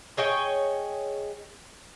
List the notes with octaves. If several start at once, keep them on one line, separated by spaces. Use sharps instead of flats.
G#4 C#5 D#5 G5